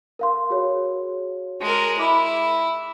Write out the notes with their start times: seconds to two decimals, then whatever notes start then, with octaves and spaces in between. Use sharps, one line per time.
0.19 A#4 F5 C6
0.50 F#4 G#4 C#5
1.61 G#3 A#4
1.99 E4 B5 D6